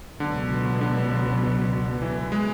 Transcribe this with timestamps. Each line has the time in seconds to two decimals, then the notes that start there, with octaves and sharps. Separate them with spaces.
0.20 C#2 B2 D3 F#3 B3
0.81 D3
2.02 E3
2.32 G#3